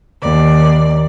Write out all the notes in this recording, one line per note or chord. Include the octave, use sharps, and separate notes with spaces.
D#2 D5